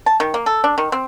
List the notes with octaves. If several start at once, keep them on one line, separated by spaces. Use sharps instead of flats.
A5
D#3
A#3
A4
D4
D#3
C4